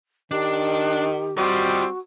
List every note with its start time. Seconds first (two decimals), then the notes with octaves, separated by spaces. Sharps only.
0.31 D#3 D4 G4
1.38 G3 C4 F4 F#4 D#5